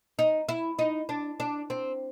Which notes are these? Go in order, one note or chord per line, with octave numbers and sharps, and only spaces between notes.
D#4
E4
D#4
D4
D4
C4